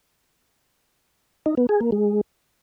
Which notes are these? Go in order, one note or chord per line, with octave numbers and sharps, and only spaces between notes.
D#4
B3
G#4
A#3
G#3